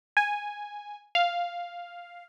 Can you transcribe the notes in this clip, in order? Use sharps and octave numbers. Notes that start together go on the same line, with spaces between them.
G#5
F5